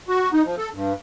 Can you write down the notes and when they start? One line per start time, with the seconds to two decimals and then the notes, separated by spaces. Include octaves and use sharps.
0.08 F#4
0.33 D#4
0.45 F3
0.57 A4
0.74 G2